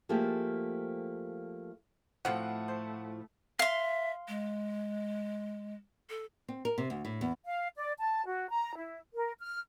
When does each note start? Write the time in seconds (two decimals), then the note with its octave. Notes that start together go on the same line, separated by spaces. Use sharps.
0.09 F3 A3 A#3 C4 G4 G#4
2.25 A2 F3 A3 C4 F#4 F#5
2.68 C5
3.59 E5 F5 C6
4.28 G#3
6.10 A4
6.48 C4
6.65 A#4
6.78 C3
6.90 D2
7.05 A2
7.21 E2
7.45 F5
7.76 D5
7.98 A5
8.25 F#4
8.51 A#5
8.76 E4
9.14 A#4
9.39 F6